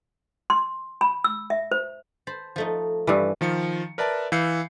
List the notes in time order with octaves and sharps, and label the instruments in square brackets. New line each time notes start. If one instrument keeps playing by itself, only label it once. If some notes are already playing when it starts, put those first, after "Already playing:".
[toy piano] C6
B5
E6
E5
C5
[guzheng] C5 A5 B5
F3 A3 D#4
[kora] G2 E3 [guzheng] A4 B4
[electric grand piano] D#3 F3 F5 C#7
A#4 B4 D5 E5 A5
E3 F5 E6 G6 C7 C#7